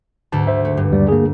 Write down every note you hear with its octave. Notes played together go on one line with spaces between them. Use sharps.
D2 G#2 A5
C5 E5
A3
G2
D#2 G3 D5
A#3 G#4